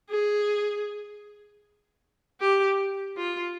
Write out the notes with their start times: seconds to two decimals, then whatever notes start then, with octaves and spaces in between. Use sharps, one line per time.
0.11 G#4
2.41 G4
3.18 F4